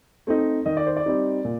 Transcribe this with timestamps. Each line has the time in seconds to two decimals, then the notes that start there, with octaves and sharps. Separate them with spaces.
0.27 A3 C4 D#4
0.66 D#3 D#5
0.77 D5
0.87 C5
0.97 D5
1.06 G3 C4 D#4
1.45 A#2